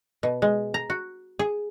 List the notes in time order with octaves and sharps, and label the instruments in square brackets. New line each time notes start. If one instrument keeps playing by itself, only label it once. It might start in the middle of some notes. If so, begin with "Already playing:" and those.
[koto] B2
G#3
A#5
F#4
G#4